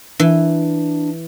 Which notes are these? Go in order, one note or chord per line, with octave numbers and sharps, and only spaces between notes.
E3 D4